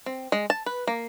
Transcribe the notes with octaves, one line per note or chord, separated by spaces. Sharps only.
C4
G#3
A5
B4
A#3